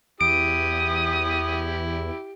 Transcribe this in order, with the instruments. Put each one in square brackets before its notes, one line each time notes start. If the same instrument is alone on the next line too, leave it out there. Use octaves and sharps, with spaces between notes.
[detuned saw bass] E2 [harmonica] E4 G4 [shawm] D#6 [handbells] D7